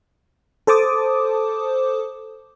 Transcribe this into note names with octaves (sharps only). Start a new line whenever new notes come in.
A4 C5 A5 D6 D#6